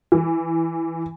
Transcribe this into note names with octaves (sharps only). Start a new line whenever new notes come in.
E3